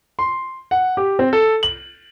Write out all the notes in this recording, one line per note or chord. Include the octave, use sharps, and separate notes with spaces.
C6
F#5
G4
C4
A4
F#7